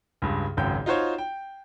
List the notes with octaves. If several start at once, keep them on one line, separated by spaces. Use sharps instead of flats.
C#2 G2
G#1 C#2 F#2 G5 G6
D#4 F4 F#4 C5 C#5
G5